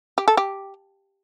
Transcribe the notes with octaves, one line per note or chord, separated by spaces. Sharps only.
G4
A4
G4